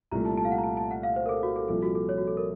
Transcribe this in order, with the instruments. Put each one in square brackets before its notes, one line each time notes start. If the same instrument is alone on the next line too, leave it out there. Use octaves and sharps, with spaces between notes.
[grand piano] C2 A#2 A3 [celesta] A#5
[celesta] A5
A5
F5
F#5
A#5
A5
A5
F#5
F5
C5
A#4
A4
F#4
A4
[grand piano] C2 A#2 F3 [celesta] A4
[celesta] F#4
A4
C#5
F#4
A4
A#4